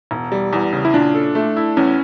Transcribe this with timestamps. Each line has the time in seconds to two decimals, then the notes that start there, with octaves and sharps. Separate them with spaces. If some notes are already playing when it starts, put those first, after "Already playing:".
0.11 E1
0.32 G3
0.53 E2
0.72 C#3
0.85 E4
0.94 A#2 D4
1.14 A4
1.35 A3
1.56 E4
1.77 E2 C#4